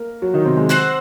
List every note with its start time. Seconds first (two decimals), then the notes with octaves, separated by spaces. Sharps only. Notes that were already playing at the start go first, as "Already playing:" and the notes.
Already playing: A#3 A#4 D#5
0.22 F#3 F#4
0.34 D#3 D#4
0.45 C3 C4
0.57 G#3
0.69 C4 F#4 C5 F#5